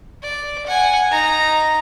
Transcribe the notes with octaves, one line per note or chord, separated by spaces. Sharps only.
D5
F#5 G#5
D#4 A#5